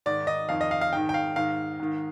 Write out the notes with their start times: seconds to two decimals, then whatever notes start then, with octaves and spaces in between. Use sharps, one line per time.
0.06 G#2 D#3 D5
0.27 D#5
0.49 F2 D#3 F5
0.61 D#5
0.71 F5
0.81 F5
0.93 G#2 D#3 G5
1.09 G5
1.14 F5
1.36 G#2 D#3 F5
1.80 G#2 D#3